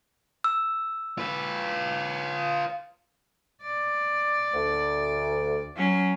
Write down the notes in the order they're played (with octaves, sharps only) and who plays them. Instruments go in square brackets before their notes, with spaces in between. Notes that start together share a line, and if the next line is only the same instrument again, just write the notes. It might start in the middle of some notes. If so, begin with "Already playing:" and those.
[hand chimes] E6
[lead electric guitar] F4 B4
[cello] D5
[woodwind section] D2
[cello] F#3 C#4